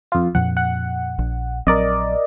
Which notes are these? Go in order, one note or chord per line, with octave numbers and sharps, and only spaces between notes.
F2 F4
F2 A#2 F3 F#5
F#5
A#1
A#1 F#3 C4 A#4 D5 D#5